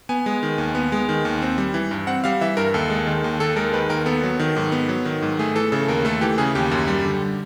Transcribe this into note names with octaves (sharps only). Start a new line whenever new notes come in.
B3 G#5
G#3
D#3
D#2
B3
G#3
D#3
D#2
C4
G3
E3
G2
C4 F#5
G3 F5
E3 E5
G2 A#4
D#2 A4
G#3
D#3
D#2
D#2 A4
G#3 A#4
D#3 B4
D#2 A#4
B3 A4
F#3
D#3
G#2
B3
F#3
D#3
G#2
A3 G#4
E3 A4
C#3 A4
D#2 A#4
A3 A4
E3 G4
C#3 G#4
D#2 G4
F#2
G3
D3